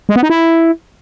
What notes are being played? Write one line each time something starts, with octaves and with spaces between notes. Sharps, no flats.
G#3
B3
D#4
E4